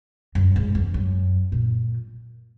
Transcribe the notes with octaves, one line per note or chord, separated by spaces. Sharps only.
F#2
G#2
E2
F#2
A#2